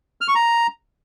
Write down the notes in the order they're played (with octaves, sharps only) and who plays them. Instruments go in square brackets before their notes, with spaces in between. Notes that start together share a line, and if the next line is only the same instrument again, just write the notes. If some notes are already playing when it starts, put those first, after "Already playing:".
[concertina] F6
C#6
A#5